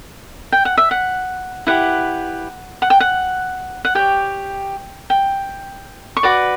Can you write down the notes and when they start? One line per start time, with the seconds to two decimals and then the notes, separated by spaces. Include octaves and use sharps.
0.52 G5
0.65 F#5
0.78 E5
0.91 F#5
1.67 E4 G4 B4 F#5
2.82 F#5
2.90 G5
3.00 F#5
3.85 F#5
3.95 G4 C#5 G5
5.10 G5
6.17 C#6
6.23 F#4 B4 D5 D6